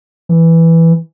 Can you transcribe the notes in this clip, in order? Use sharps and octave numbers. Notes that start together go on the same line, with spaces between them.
E3